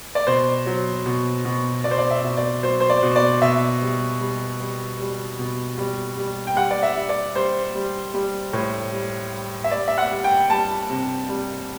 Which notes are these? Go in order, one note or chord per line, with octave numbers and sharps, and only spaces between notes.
D5
B2 C5
F#3
B2
B2
B2 D5
C5
D5
E5
B2
D5
F#3 C5
C5
D5
B2
D5
B2 E5
G3
G3
G3
G3
B2
G3
G3
G5
G3 F#5
D5
E5
G3
D5
G3 C5
G3
G3
A2
G3
G3
E5
G3 D5
E5
F#5
G3
G5
G3 A5
C3
G3